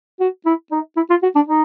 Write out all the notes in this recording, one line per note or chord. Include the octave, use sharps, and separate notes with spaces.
F#4
E4
D#4
E4
F4
F#4
D4
D#4